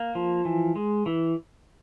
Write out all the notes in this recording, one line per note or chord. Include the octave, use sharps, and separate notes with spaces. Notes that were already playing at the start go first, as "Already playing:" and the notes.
Already playing: A#3
F3
E3
G#3
E3